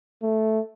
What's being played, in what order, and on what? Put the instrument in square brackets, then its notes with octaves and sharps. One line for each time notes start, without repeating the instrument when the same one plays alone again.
[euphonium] A3